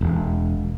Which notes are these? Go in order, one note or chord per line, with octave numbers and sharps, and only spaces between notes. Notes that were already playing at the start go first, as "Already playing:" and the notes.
E1